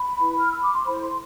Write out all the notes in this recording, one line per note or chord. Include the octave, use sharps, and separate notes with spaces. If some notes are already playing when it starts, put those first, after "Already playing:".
Already playing: B5
E4 B4
F6
E6
D6
C6
E4 A4 C5 B5
C6